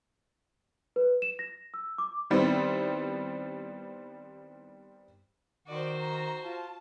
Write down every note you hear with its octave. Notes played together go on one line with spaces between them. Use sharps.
B4
E7
A#6
E6
D6
D#3 G3 B3 C4 E4
D#3 F#4 C5 D5
A#5
F4 A5